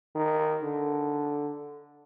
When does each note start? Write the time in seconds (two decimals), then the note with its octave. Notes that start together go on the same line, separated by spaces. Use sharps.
0.15 D#3
0.63 D3